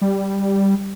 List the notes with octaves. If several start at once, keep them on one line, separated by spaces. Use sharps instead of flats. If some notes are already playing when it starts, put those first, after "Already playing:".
G3